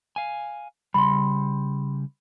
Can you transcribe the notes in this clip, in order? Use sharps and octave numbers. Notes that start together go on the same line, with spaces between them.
F5 G#5
C#3 G3 B5 C6